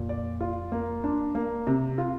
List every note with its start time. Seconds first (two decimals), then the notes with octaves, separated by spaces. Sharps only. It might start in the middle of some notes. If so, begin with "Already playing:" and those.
Already playing: F2 A#2
0.09 D5
0.41 F4
0.72 A#3
1.04 D4
1.35 A#3
1.67 C3
1.98 F4